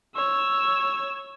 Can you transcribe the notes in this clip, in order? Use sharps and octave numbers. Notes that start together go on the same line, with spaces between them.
C#5 E6